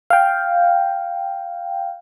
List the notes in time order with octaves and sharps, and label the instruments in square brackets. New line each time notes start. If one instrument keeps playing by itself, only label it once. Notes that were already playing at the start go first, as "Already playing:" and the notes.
[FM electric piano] F5 G5